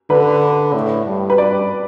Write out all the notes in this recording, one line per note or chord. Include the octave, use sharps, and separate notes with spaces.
D3 B4
A2
G2
B4
G2 D5